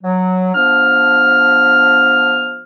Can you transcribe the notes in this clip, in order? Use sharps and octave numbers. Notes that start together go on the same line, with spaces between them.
F#3
F3 B3 D4 F6